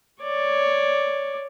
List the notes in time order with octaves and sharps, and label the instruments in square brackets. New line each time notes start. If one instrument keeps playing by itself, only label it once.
[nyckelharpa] C#5 D5